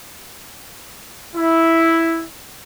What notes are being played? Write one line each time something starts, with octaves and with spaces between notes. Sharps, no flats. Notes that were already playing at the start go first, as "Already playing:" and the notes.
E4